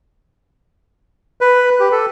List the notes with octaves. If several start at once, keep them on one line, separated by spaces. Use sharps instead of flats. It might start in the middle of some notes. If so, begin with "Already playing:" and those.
B4
G4
A4